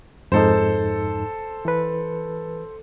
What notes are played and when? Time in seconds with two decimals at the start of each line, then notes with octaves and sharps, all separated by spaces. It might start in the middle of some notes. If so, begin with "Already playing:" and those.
0.32 F2 G#2 D#4 A4 C5
1.65 E3 B4